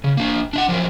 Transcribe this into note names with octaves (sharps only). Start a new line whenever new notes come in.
C#3
A#3 D4
D4 E5 F#5
F3 F#3 A#4